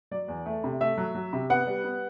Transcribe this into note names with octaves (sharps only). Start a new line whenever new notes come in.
F#3 D5
E2
A3
C3
A3 E5
F#3
F#3
C3
B3 F#5
G3
B3